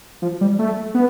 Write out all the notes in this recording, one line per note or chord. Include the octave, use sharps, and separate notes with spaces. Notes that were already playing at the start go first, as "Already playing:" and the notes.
F3
G3
A3
B3